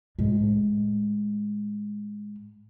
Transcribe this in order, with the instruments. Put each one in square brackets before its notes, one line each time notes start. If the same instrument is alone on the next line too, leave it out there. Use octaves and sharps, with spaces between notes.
[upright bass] A2 G#3